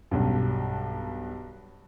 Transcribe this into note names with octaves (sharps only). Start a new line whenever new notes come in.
B1 G2